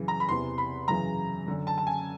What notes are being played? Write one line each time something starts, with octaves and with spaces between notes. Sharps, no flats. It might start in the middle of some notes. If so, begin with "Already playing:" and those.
Already playing: F#2 C#3 E3
A#5
B5
E2 C3 E3 C6
B5
F#2 C#3 E3 A#5
F#2 D3
A5
A5
G#5